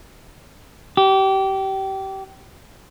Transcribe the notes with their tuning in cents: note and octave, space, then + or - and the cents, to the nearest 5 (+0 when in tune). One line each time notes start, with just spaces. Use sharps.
G4 -25